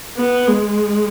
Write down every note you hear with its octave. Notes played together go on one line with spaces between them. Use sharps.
B3
G#3